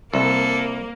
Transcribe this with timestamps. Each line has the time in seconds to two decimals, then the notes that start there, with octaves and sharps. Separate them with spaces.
0.14 C2 A#3 A4